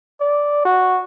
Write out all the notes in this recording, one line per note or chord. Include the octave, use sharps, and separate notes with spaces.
D5
F#4